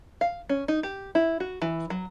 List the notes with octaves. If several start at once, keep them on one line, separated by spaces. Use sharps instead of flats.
F5
C#4
D#4
G4
E4
F#4
E3
F#3